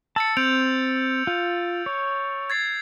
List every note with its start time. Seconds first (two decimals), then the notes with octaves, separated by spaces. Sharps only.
0.16 A5 E6 A6 C#7
0.37 C4 G6 D7 F7
1.27 F4
1.86 C#5
2.50 G#6 A6 C7